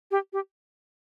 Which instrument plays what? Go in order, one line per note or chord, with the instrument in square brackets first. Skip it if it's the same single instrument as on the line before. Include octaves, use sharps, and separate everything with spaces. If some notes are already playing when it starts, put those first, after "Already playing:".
[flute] G4
G4